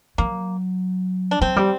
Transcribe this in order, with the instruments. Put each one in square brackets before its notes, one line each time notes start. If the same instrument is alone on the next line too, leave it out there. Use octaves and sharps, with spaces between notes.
[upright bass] F#3 [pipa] A#3
[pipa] D4
[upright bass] F#3 [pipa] C4
[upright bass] G3